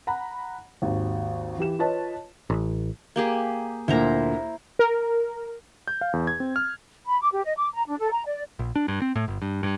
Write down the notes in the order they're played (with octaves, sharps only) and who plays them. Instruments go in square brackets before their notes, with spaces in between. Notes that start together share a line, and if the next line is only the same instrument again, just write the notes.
[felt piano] F#5 A#5 B5
G#1 D#2
E3 G4 E7
F4 B4 C#5 D#5 A5
[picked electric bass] A1
[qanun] A#3 G4 G#4
[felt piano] D2 A#2 [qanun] E4 C5 A#5
[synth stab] A#4
[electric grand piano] G6
F5
E2
G#6
C4
F6
[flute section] B5
D6
G4
D#5
D6
A#5
D4
A4
A#5
D5
[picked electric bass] A#1
D4
G2
C4
A2
G1
G2
G2